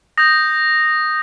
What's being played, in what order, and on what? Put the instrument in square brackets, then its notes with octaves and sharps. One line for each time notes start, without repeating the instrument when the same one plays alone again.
[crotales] D#6 G6 A#6